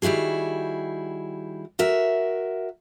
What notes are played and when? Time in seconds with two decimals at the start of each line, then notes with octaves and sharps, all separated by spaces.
0.02 D#3 G3 E4 F#4 G#4
1.79 F#4 A#4 E5